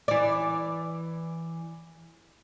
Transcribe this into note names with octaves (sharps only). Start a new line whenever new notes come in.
E3 D5